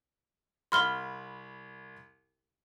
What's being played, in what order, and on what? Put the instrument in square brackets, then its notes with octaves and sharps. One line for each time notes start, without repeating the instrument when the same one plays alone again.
[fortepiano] C2 B5 [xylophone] C6 F6 G7